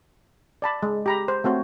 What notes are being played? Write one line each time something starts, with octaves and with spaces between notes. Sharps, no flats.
D5 A5 B5
G#3
G4 A#5 B5
C5
A3 C4 F#4 C5 C#5